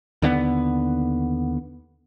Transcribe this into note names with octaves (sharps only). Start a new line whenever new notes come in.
D#2 D3 A#3 B3